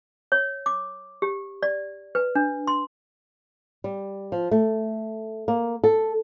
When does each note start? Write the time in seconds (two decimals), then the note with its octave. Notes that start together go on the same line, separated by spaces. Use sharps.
0.32 C#5
0.66 D6
1.22 G4
1.63 D5
2.15 B4
2.35 D4
2.67 C6
3.84 G3
4.32 F3
4.51 A3
5.48 A#3
5.84 A4